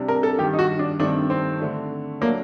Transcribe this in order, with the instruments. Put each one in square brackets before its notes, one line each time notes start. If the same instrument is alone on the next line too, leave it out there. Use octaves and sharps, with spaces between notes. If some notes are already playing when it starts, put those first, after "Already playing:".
Already playing: [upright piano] C3 G3 D4
[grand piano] A#4
A4
[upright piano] G2 D#3 G3 [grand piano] G4
[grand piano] D#4
F#4
D4
[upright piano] G2 D#3 A3 C4 D#4 [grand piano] D4
[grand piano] C4
[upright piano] D3 A3 D4
[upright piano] F#3 A3 D4 [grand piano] A#3